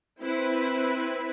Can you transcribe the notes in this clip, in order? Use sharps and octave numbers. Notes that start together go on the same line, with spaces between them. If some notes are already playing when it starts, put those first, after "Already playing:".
C4 E4 B4